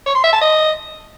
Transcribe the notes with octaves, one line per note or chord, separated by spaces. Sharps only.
C#5
C6
E5
A5
D#5